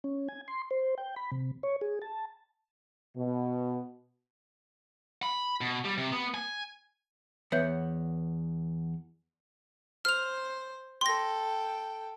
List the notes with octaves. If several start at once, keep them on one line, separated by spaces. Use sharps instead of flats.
C#4
G#5
C6
C5
G5
B5
C3
C#5
G#4
A5
B2
B5
B2
G3
C3
B3
G#5
E2 B3 C#5 E5 G6
C5 F6 F7
A4 G5 C6 A#6